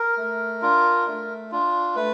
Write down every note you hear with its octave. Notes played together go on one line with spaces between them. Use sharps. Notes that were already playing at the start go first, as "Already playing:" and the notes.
Already playing: A#4
A3
D4 F4
A3
D4 F4
A3 B4